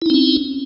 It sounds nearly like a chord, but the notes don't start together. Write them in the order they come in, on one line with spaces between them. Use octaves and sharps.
E4 D#4 C4 C#4